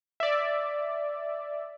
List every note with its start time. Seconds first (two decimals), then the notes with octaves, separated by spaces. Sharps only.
0.20 D5 E5